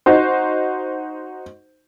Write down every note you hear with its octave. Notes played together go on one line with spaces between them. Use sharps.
D#4 F#4 C5